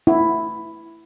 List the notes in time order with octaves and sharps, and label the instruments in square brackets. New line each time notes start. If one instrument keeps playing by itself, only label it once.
[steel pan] E4